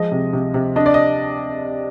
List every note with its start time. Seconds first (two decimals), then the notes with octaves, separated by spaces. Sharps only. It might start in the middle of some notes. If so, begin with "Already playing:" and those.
Already playing: F3 G#3 D#5
0.12 C3
0.33 C3
0.54 C3
0.76 D4 D#5
0.86 D5
0.94 D#5